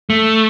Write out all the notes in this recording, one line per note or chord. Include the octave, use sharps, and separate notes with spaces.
A3